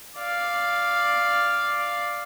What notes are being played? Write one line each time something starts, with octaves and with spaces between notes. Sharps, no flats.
D5 F5